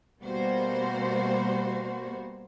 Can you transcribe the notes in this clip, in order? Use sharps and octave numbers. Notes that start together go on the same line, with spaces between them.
B2 G3 A#3 F#4 C5